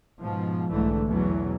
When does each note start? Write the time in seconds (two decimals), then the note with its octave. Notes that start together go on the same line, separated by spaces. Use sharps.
0.21 G#2 B2 F3
0.70 B1 G#2 D3 E3 A3
1.08 E2 B2 E3 F#3